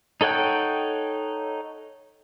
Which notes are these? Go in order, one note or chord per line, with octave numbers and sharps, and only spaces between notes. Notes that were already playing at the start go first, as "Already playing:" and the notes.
D#4 A4 C#5 F#5 G5